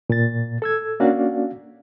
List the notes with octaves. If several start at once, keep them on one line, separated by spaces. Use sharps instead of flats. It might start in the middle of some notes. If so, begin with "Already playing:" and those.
A#2 A6
A4 E6 G#6
A#3 C#4 D4 F#4 D5 F5